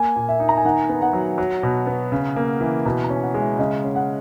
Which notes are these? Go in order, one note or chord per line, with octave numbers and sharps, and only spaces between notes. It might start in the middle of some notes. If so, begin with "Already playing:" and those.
Already playing: A#3 G#5
A#2
E5
D#4
A#5
G#5
D#3 F#5
B3
F#5
F#3
F#3
B2
B3
C#3
A#3
E3
B2 A#5
A#5
C#4
G#5
F#5
G#3
E5
C#3 D#5
C#4
F#5